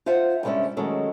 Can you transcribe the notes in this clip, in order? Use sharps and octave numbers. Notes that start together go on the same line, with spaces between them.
F4 C5 E5 F#5
G2 C3 G#3 C#4 D5 E5
D#3 F#3 G#3 A3 C#4 A4